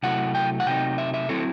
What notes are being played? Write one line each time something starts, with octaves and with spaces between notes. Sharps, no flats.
C3 F#3 A3 E4 F#5
G5
F#5
C3 F#3 A3 C4 D#4 G5
E5
E5
F#3 C4 E4 A4